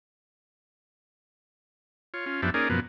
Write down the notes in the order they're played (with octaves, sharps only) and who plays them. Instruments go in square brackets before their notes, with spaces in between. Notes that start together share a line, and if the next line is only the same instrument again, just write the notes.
[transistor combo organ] F4 C#5
C#4 F4
F#2 F3 B3 D4 G4 E5
A#3 C#4 D#4 G#4 A#4 D5
F#2 B2 F3 A#3 B3